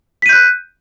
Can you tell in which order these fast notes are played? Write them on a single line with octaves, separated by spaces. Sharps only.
B6 D#7 G6 F#6